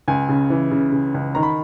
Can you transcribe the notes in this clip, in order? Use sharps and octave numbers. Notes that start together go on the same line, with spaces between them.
C#2 G#5
C#3
E3
C#3
C#3
C#2
D#3 A#5
B5